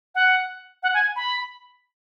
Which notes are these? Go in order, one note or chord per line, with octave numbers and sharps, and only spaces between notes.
F#5
F#5
G#5
B5